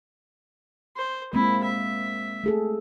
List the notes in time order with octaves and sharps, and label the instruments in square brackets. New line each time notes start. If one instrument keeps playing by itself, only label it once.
[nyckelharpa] C5
[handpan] G#3 A#3 C4 [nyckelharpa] E4
[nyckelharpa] E5
[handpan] A3 G#4 A4